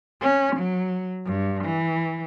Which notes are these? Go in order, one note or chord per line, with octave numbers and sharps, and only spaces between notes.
C#4
F#3
G2
E3